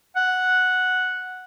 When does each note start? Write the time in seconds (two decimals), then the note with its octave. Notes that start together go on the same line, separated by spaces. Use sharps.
0.16 F#5